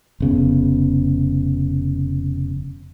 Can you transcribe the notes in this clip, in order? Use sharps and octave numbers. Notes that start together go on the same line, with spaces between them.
F1 C#3 B3